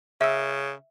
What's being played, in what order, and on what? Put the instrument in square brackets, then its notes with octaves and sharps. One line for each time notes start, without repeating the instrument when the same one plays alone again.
[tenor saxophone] C#3 [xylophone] E5 E6